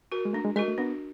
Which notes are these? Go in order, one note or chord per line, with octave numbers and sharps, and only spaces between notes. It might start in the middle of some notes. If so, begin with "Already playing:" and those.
F#4 A#4
G#3
A3 D4
G#3
G#3 F#4 A#4 D#5
A3
B3 D4